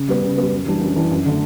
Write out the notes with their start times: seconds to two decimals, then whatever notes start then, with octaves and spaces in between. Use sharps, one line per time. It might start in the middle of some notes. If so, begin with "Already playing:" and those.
Already playing: C#3
0.08 G3 B3
0.23 C#3
0.38 G3 B3
0.52 F#2
0.66 E3 G3 D4
0.81 F#2
0.96 E3 G3 D4
1.11 F#2
1.26 D3 A3